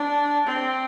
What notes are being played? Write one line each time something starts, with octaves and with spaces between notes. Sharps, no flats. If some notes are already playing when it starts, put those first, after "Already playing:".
Already playing: D4
C4